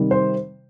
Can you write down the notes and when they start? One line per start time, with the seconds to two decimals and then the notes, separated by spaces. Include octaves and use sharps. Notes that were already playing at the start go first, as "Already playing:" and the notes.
Already playing: C3 D#3 G3
0.11 C5